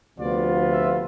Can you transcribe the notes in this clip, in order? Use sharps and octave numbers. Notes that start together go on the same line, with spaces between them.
D2 C3 F3 B3 F4 D5
E5